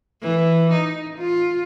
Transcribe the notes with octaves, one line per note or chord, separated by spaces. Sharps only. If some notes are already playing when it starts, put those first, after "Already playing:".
E3
D#4
F4